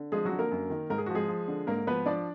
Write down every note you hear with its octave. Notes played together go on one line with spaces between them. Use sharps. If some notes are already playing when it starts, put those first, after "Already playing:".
Already playing: D3
F3 G#3 G#4
F#3 F#4
D3
A#3 A#4
F#2
D#3
G#2 A#4
G#4
F#4
F3
G#3 G#4
F3
D3
G#2 A#3 A#4
F3 B3 B4
F3 D4 D5